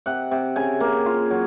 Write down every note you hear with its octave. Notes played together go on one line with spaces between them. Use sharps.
C3 F#5
C3
C#3 G#5
A#3
F4
F#3